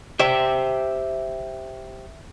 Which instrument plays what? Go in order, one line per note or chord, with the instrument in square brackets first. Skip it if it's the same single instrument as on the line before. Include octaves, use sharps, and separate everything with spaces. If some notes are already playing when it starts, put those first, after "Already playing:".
[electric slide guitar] G4 C5 G5 [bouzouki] E5